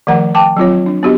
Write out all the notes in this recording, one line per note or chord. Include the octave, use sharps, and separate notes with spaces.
D#3 F3 A3 A#4 F#5 A#5
G5 A5 D6
F#3 C4 F4 C#5
D4
B3 D4 F#4 G4 D#5